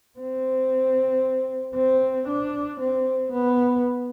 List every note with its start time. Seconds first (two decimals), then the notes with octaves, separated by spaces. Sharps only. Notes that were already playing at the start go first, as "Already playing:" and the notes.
0.19 C4
1.75 C4
2.28 D4
2.80 C4
3.32 B3